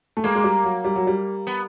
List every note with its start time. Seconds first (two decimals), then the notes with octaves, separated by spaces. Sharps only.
0.17 A3
0.24 G#3 A#3
0.35 G#3
0.44 G3
0.64 F#3
0.84 G3
0.96 F#3
1.07 G3
1.47 B3